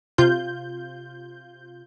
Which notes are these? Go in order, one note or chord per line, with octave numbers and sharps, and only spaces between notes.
C3 F4 G6